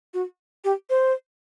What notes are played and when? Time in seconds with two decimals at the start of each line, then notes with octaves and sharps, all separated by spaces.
0.14 F#4
0.65 G4
0.90 C5